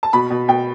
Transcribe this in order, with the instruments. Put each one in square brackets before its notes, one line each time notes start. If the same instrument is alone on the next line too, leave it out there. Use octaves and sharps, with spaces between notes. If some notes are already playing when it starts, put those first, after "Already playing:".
[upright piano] A5
B2 B5
B2
B2 G5